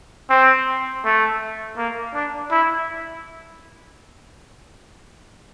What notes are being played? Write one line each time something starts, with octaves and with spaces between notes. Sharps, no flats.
C4
A3
A#3
D4
E4